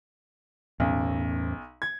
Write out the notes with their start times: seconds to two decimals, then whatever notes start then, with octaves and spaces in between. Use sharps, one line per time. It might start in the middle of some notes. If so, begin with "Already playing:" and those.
0.80 B1 E2 A2 C#4
1.82 G#6